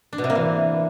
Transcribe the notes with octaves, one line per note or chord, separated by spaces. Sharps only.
D4
B2
C3
A#3
E3